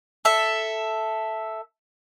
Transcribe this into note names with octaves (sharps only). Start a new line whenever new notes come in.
A4 E5